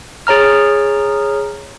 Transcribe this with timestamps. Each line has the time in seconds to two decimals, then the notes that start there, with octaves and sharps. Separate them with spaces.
0.27 G#4 C#5 A#5 F6